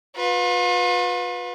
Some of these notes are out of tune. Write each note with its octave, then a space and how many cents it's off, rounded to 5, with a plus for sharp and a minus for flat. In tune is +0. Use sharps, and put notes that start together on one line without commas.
F4 +40 B4 -5